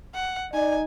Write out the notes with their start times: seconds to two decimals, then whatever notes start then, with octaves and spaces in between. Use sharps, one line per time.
0.14 F#5
0.54 D#4 D5 G#5